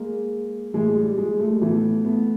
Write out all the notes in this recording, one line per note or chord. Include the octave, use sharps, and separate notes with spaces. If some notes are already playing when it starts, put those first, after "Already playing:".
Already playing: G#3 A#3
A2 E3 G#3
G3
G#3
G3 A3
A2 E3 A3 B3
A3 B3